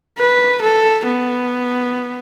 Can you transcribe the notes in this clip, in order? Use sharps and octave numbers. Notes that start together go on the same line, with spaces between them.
B4
A4
B3